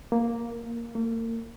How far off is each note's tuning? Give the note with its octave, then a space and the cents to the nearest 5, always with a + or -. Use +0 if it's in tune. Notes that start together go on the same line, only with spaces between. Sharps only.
A#3 +0
A#3 -40